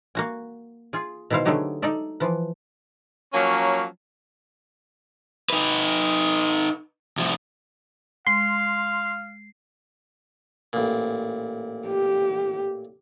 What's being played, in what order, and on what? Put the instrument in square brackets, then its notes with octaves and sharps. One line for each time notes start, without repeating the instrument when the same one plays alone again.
[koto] A#3 F#4 G#5
F4 G#4
B2 D#3 E4 C5 F5
D3 F#3 A3 D#4 G4 G#4
D#4 A4 D5 E5
E3 F3 B4
[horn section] F3 F#3 A#3 C#4
[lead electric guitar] D#4 B4
C2 F3
[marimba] G#3 [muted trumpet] F5 [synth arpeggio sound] C6 [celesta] C7
[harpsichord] A1 A#2
[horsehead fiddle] G4